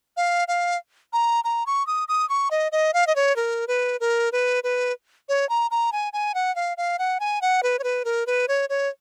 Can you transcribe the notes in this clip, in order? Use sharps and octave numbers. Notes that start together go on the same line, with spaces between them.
F5
F5
A#5
A#5
C#6
D#6
D#6
C#6
D#5
D#5
F5
D#5
C#5
A#4
B4
A#4
B4
B4
C#5
A#5
A#5
G#5
G#5
F#5
F5
F5
F#5
G#5
F#5
B4
C#5
B4
A#4
B4
C#5
C#5